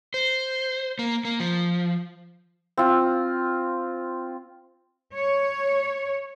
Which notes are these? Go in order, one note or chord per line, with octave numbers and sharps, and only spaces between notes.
C5
A#3
A#3
F3
C4 F4
C#5